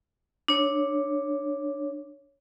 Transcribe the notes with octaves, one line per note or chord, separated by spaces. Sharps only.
D4 C#5